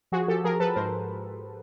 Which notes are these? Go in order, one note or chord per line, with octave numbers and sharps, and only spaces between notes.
F3 F#4 G#4
F3 G4 A4
F3 G#4 A#4
F3 A4 B4
G#2 A#4 C5